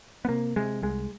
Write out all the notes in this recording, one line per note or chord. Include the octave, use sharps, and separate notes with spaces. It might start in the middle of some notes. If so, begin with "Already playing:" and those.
B3
C3 A#3
C3 G#3
C2 G#3